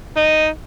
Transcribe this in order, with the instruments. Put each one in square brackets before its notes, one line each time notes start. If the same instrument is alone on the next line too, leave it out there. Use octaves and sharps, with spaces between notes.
[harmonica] D#4